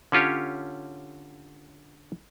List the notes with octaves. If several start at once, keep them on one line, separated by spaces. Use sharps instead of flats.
D3 C#4 F4 G4 C#5